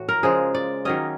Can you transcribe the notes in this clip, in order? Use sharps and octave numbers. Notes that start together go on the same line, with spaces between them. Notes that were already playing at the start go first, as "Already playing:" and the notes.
Already playing: A2 E3 F#4
A#4
C#3 F3 G#3 G#4
D5
D#3 F#3 A#3 C#4 D#5